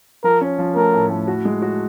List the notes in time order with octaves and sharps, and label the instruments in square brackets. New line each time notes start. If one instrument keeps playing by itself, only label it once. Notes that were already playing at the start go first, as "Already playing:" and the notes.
[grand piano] F3 [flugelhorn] A#4
[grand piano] C#4
F3
[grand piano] A3 [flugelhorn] A#4
[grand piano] A2
A2
F#4
G#3
F#4